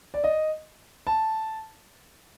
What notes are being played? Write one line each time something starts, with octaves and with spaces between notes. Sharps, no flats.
D5
D#5
A5